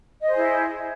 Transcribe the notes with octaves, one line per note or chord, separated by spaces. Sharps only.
E4 G#4 C5 D#5